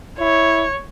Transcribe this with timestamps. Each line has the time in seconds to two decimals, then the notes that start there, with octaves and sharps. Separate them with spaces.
0.19 E4 C#5